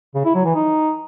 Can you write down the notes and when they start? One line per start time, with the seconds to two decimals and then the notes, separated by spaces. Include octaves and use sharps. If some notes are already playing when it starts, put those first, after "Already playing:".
0.15 C#3
0.25 E4
0.35 F#3
0.45 E3
0.55 D#4